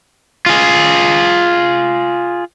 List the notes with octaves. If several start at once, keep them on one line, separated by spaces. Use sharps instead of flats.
F4 G#4